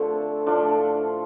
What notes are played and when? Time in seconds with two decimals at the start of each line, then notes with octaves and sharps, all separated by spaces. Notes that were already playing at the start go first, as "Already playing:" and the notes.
Already playing: D3 F3 A3 C4
0.46 A2 F3 A3 D4 F4